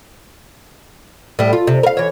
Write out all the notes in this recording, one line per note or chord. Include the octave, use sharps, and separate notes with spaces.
A2 G3
F4
C3
A#4 F5
E3 C#5